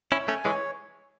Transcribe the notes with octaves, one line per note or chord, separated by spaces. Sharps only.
C#4 E4 C#5
A3 C#4 G#5
E3 G#3 C#5